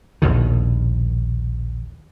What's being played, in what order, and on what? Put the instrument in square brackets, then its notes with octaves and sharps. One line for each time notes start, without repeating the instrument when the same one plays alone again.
[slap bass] A#1 D#2 B2 D#3